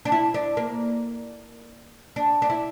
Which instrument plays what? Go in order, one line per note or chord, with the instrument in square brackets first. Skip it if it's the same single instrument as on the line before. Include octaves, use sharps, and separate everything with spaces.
[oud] D4
E4
D4
A#3
D4
D4
E4